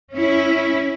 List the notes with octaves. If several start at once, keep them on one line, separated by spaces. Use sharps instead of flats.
C#4 E4